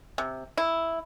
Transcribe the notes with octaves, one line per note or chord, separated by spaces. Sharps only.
C3
E4